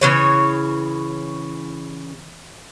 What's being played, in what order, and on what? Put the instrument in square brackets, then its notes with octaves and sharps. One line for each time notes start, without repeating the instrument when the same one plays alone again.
[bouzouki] C#3 E3 C#5